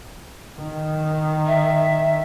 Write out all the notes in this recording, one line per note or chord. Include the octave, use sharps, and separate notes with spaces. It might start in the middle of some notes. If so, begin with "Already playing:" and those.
D#3
E5